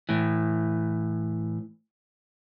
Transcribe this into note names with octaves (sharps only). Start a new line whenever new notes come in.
A2 E3